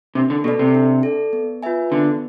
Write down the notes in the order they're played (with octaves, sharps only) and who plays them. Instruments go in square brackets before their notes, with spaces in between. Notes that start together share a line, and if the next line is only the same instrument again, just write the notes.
[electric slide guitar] C3 [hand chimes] D4
[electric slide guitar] D3
[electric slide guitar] B2 [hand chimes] A4
[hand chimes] D5
[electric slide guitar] C3
[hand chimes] D4
A4 D5
B3
F4 B4 E5 G#5
[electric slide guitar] D3 [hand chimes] B3